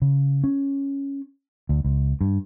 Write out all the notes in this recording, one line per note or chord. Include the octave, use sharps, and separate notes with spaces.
C#3
C#4
D2
C#2
G2